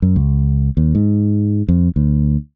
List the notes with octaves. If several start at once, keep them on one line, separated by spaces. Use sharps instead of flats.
F#2
C#2
D#2
G#2
F2
D2